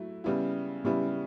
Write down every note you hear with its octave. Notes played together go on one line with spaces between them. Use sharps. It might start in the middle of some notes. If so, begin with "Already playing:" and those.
Already playing: F#3 A3 E4
C#3 G3 B3 E4
C#3 G3 B3 E4